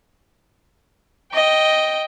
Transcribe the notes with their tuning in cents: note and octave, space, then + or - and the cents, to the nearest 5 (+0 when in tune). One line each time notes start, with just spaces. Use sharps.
D#5 +0 G5 +0